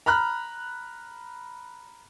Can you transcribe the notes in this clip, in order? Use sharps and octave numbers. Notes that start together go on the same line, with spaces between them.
A#5 B5 F6 F#6